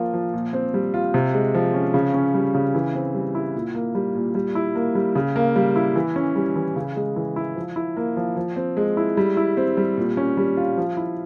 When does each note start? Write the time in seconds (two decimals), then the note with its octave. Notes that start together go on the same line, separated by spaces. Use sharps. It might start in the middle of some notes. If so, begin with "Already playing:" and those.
Already playing: F3 A#3 F4
0.13 F3
0.33 A#2
0.53 C4
0.74 G3
0.94 F4
1.14 C3
1.34 G#3
1.55 F3
1.74 C#4
1.94 C#3
2.14 C#4
2.34 G3
2.55 C#3
2.75 E3
2.95 C4
3.15 G3
3.35 E4
3.55 A#2
3.75 A#3
3.95 G3
4.15 A#2
4.35 G3
4.55 E4
4.75 A#3
4.95 G3
5.15 C#3
5.36 A#3
5.56 G3
5.76 E4
5.96 E3
6.16 C#4
6.36 G3
6.56 E3
6.76 C#3
6.96 G#3
7.16 E3
7.36 E4
7.56 F3
7.76 E4
7.97 A#3
8.17 F3
8.36 F3
8.56 C4
8.77 G#3
8.97 E4
9.17 G3
9.37 E4
9.57 C4
9.77 G3
9.97 A#2
10.17 C#4
10.37 G3
10.57 F4
10.77 F3
10.97 E4